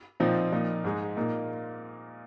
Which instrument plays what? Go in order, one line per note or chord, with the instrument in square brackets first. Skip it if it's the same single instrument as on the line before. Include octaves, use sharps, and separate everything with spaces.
[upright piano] A#2 F3 C4 D#4
A#2 F3 A#3 D#4
G#2 G#3 D#4
A#2 A#3 D#4